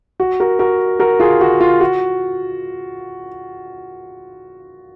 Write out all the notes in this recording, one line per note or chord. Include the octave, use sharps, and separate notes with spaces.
F#4
F#4 A#4
F#4 A#4
F#4 A#4
F4 G#4
F#4
F4
F#4